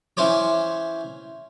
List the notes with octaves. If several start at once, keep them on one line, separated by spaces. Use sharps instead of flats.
E3 C#4 C5 C#5 D6